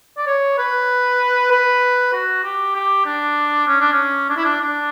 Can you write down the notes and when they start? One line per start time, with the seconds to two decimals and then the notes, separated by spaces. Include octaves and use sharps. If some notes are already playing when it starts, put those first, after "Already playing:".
0.18 D5
0.27 C#5
0.58 B4
1.51 B4
2.13 F#4
2.44 G4
2.75 G4
3.06 D4
3.67 C#4
3.80 D4
3.92 C#4
4.30 D4
4.37 E4
4.44 D4
4.62 D4